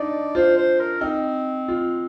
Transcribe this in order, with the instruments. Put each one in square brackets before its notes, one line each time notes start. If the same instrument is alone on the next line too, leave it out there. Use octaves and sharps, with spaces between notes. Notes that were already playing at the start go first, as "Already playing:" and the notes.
Already playing: [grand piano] D4 D#4 [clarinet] D5
[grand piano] F4 [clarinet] C5
[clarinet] C5
A#4
[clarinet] C4 [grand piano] D#4
[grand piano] F4